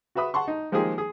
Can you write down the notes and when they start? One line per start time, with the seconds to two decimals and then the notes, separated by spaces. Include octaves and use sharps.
0.15 F#4 B4 E5 B5 D#6
0.34 F#5 A5 C6 C#6
0.48 D#4
0.72 D#3 F3 G#3 A#3 G4 G#4
0.98 G#4